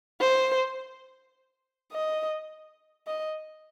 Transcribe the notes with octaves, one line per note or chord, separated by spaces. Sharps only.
C5
D#5
D#5